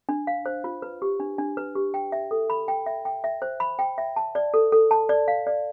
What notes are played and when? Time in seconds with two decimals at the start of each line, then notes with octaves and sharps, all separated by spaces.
0.09 D4
0.27 F5
0.46 C5
0.64 F4
0.82 B4
1.02 G4
1.20 D4
1.38 D4
1.57 B4
1.75 G4
1.94 G5
2.12 E5
2.31 A4
2.50 B5
2.68 G5
2.86 E5
3.05 G5
3.24 E5
3.42 C5
3.60 B5
3.79 G5
3.98 E5
4.16 A5
4.35 D5
4.54 A4
4.72 A4
4.91 A5
5.09 D5
5.28 F5
5.47 D5